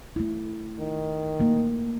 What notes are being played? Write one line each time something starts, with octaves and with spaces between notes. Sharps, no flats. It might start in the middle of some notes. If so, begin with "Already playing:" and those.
A3 E4
D#3
A3 A#3